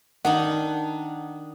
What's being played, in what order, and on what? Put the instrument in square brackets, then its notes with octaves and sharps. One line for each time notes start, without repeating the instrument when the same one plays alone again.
[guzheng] D#3 D4 D#4 [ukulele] F#5